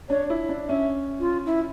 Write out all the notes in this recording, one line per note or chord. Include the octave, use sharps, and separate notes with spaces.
D4 C#5
E4
D4
C#4 E5
F4
E4